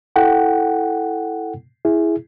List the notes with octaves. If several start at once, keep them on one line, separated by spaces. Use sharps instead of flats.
E4 A4 F#5 G5
E4 G#4